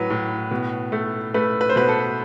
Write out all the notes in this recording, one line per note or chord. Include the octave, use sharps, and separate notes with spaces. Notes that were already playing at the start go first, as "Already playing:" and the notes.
Already playing: A2 F#3 B4
A2
B2
A3
A3 B4
B4
C5
B2 B4
A4